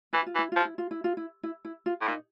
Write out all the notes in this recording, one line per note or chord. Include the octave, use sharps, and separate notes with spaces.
E3 E4
F4
E3
E4
F3 F4
E4
F4
E4
F4
E4
E4
E4
F4
A2
A#2 D#4